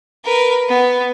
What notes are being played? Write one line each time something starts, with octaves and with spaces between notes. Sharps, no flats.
A#4 B4
B3